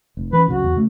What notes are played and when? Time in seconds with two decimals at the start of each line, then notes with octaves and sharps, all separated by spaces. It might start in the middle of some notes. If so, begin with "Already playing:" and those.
0.17 F1
0.33 E3 C#4 B4
0.48 C2 F#2 C#3 F#4
0.64 E2
0.76 C#3 A3